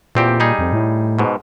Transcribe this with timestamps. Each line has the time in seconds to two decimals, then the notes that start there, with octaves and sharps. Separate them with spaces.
0.15 E2 A#2 C4 G4
0.40 G3 D#4 G#4
0.59 F2
0.73 A2
1.19 G#2 B2